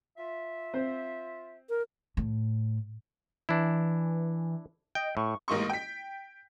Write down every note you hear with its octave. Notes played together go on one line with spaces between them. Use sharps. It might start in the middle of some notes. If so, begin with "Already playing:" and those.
F4 E5
C4 C5
A#4
A2
E3 D4 E4
D#5 G5
A2 C#6
A1 G#2 A#3 D#5 C6 C#6
G5 B6